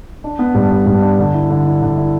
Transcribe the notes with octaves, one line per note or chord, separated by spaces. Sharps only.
D4
B3
G2
G2
G2
D4
D3
E4
D3
E4
D3
E4